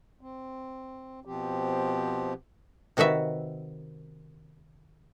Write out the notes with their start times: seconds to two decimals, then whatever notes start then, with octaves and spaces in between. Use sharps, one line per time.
0.21 C4
1.25 B2 F3 C4 G4
2.97 C3 D#3 F#4 B4 E5